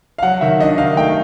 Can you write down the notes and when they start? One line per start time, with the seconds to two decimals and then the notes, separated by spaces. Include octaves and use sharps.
0.18 F5
0.23 F#3 F#5
0.41 D#3 E5
0.60 D4 D#5
0.78 D#3 F5
0.97 A3 G5